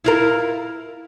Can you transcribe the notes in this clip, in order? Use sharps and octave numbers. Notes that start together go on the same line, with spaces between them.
E4 F4 A#4